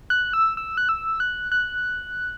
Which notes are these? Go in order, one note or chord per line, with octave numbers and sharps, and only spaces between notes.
F#6
E6
E6
F#6
E6
F#6
F#6